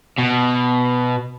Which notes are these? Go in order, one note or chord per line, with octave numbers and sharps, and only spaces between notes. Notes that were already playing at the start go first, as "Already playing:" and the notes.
B2